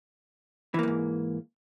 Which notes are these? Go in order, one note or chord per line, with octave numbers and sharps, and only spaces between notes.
F2 G#2 E3 A#3